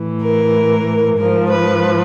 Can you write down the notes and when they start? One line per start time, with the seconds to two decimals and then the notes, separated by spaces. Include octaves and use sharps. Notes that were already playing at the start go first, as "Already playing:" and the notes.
Already playing: A2 E3
0.21 A#4
1.18 G#2 F3 A#4
1.50 B4